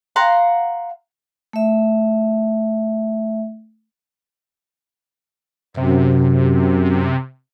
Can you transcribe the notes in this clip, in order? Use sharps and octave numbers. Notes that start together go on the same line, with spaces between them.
F5 F#5 A#5 C6
A3 E5
F#2 C3